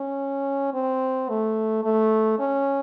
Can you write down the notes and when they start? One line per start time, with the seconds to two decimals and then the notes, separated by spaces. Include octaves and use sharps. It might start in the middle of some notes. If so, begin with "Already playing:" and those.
Already playing: C#4
0.74 C4
1.29 A3
1.84 A3
2.39 C#4